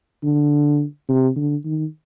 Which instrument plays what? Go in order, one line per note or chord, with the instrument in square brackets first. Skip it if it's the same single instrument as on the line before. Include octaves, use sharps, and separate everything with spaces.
[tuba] D3
C3
D3
D#3